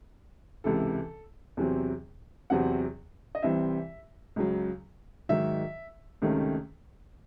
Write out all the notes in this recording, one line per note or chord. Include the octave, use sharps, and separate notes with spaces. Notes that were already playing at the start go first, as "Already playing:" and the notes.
C#2 C3 E3 A4
E2 C3 F#3 C4
E2 C3 F#3 C4 F#5
D#5
C2 C3 E3 C4 E5
C#2 C#3 F#3
G#2 D#3 F#3 E5
C#2 C3 D#3 A3 C#4